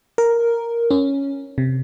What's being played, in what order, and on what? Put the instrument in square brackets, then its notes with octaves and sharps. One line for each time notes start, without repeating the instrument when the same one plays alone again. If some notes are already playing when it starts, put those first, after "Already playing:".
[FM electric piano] A#4
C#4
C3